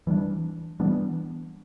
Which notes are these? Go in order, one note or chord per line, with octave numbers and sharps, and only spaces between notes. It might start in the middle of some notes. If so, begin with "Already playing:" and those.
E3 G3 B3 D4
E3 G3 B3 D4